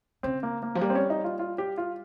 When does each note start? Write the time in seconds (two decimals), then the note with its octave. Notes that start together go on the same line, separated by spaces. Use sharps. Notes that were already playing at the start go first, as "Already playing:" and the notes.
0.23 C#3 C4
0.43 A#3
0.63 A#3
0.75 F3
0.81 G3 A#3
0.90 C4
0.95 C#4
1.10 D#4
1.24 F4
1.39 F4
1.58 G4
1.78 F4